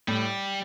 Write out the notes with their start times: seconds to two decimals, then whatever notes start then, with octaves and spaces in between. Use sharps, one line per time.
0.08 A2 G3